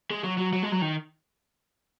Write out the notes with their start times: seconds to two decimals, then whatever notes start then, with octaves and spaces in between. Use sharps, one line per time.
0.11 G#3
0.24 F#3
0.38 F#3
0.53 F#3
0.63 G#3
0.72 F#3
0.82 D#3